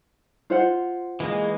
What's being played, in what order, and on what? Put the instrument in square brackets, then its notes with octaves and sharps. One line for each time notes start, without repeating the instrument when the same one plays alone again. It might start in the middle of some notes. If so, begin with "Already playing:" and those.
[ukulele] F4 C5 F#5
[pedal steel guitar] E3 G#3 A#3